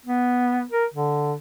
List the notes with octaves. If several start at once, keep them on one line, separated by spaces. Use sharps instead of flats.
B3
A#4
D3